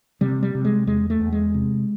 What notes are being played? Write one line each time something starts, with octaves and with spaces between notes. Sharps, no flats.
C3 G3
G3
C3
G#3
E2 G#3
A3
E2
G#3
C3